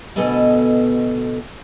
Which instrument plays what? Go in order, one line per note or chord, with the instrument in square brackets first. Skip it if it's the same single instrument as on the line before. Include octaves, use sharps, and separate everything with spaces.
[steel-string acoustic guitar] D2 B2 B3 A4 D#5 G#5